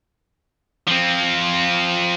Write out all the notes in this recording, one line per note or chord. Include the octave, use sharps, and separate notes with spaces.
F3 C4